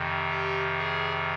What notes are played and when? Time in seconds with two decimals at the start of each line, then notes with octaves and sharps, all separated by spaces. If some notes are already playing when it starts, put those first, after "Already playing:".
Already playing: F2 C3 D#3
0.30 G4
0.78 G#4